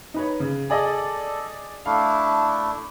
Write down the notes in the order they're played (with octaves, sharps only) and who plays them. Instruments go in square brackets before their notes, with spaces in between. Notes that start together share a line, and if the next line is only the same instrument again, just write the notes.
[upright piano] D#4 B4 C#5
C#3
[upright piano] G#4 D5 D#5 [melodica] A4
[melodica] A3 D4 E4 [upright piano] F5